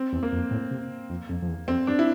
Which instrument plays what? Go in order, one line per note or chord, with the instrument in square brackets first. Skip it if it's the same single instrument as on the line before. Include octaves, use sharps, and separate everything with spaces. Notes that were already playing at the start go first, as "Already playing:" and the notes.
Already playing: [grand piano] C4
[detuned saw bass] E2
[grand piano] A#3
[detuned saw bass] F2
A2
C3
F2
F2
F2
E2
[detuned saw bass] F2 [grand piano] C4
[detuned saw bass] G2 [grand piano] D4
[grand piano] E4